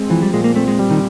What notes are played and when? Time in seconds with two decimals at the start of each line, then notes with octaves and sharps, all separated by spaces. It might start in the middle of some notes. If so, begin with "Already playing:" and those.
Already playing: G#3 C4
0.10 E3 F3
0.22 G3
0.34 A#2 G#3
0.44 A#3
0.56 A3 C4
0.68 G#3
0.79 G3
0.90 D#3